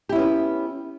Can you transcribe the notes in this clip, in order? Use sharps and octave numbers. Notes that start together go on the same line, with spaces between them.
B3 C#4 E4 G4